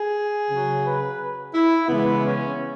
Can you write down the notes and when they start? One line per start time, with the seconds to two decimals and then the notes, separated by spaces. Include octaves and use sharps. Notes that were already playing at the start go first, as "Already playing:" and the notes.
Already playing: G#4
0.50 C#3 F#3
0.84 B4
1.54 E4
1.88 C#3 E3 G#3 B3
2.24 C#4